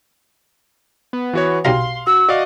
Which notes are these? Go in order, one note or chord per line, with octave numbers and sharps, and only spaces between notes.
B3
E3 F#4 C#5
B1 G3 F5 A#5 C6
F#4 E6
F#4 D5 D#5 F5